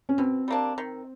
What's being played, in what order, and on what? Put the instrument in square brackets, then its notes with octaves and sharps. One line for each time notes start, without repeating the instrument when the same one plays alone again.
[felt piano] C#4
[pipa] B2 [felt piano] C4
[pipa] G3 A#3 D4
D#3